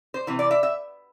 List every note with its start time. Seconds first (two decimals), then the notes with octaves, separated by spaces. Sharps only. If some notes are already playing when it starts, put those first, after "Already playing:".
0.14 C5
0.27 C3 E3
0.39 D5
0.51 E5
0.63 E5